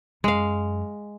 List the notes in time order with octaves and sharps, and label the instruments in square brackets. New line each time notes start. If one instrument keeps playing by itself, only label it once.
[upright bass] F#2 [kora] G#3 F5